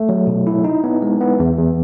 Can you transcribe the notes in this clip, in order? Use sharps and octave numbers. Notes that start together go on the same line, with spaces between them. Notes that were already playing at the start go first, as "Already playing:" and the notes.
Already playing: A3
F#3
B2
E4
D#4
B3
G#3
B3
E2
E2